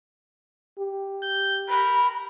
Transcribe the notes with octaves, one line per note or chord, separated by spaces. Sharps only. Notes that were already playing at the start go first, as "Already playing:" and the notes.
G4
G6
A#4 B5